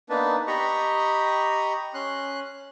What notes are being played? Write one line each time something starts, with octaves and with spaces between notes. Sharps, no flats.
A#3 B3 D4 D#4 B4 A5
G4 D#5 A#5 B5 C#6
C#4 C6 F#6